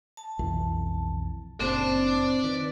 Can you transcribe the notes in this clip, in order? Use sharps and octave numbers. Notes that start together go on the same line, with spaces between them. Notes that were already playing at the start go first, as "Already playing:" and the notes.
A5
B1 F2 E3
F#1 A#2 C4 C5 D5 A5
D#3 B4